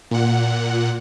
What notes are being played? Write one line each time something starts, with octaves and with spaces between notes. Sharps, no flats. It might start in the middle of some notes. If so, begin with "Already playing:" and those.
A#2 F#5